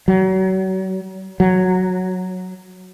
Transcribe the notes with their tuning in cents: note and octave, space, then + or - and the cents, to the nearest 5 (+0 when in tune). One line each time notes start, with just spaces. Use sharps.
F#3 +35
F#3 -5